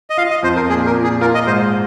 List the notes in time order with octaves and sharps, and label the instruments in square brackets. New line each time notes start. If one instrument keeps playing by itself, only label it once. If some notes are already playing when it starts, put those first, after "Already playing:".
[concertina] D#5
[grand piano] F4 [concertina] F5
[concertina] D#5
[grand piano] F2 [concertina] C5
[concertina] A#4
[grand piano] A#2 [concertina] G#4
[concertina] A#4
[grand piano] A#2
[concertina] G#4
[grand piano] F4 [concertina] A#4
[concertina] D#5
[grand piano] G#2 [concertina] C5